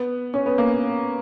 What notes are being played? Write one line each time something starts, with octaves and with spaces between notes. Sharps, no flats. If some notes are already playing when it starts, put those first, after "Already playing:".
Already playing: B3
C#4
B3
A#3